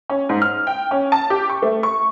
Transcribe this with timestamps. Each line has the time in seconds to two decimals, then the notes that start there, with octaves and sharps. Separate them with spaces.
0.09 C#4
0.29 G#2
0.42 F6
0.67 G5
0.91 C#4
1.12 A5
1.30 G4
1.50 C#6
1.62 A3
1.83 C#6